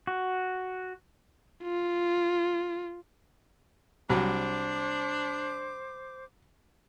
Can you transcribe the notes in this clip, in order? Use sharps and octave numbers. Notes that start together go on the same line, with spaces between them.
F#4
F4
C2 F#3 D4 C5 D6